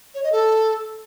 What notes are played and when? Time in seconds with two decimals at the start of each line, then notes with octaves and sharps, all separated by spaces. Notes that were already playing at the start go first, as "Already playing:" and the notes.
0.15 C#5
0.23 D#5
0.32 A4